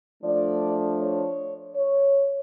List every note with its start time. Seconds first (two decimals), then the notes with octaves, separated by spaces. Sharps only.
0.23 F3 A3 D4 D5
1.00 C#5
1.75 C#5